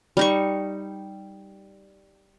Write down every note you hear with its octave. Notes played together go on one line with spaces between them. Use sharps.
G3 D#4 C#6